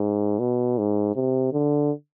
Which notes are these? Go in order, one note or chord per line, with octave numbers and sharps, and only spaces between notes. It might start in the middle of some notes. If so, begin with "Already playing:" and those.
Already playing: G#2
B2
G#2
C3
D3